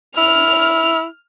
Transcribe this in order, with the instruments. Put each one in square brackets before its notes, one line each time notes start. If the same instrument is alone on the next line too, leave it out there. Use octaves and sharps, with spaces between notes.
[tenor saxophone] E4 [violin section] F6